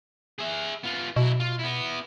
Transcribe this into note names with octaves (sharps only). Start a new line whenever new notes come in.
G#4 E5
B3 F4
B2 F#3 E4
F4
B3 E4